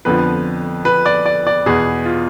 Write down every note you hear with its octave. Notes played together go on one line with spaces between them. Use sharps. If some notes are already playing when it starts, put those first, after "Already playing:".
F2 D3 F3 B3 B4
B4
D5
D5
D5
E2 B2 B3 G#4
F4